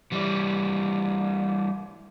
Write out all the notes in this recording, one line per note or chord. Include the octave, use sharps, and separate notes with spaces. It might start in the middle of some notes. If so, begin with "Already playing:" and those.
E3 G3